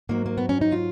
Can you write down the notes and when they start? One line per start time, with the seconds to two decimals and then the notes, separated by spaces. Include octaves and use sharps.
0.09 G#2 F#3 A#3
0.26 A#3
0.37 B3
0.49 C#4
0.61 D#4
0.72 F4